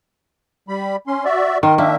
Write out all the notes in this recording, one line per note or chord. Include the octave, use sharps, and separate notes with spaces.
G3 B5
C#4 C6
F#4 D5 E5
D#3 A#4 C6
A#3 D4 E5